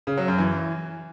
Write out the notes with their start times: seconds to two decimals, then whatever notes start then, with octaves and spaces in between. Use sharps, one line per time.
0.07 C#3
0.17 F#3
0.28 F#2
0.38 E3